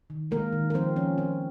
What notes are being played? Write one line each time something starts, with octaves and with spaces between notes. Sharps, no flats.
D#3
G#3 A#3 A#4
D#3
A#4
F3 C4 C5
F3 C#4
F3 C4